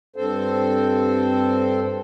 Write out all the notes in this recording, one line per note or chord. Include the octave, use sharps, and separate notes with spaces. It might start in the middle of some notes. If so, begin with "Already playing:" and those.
G2 C4 A4 C5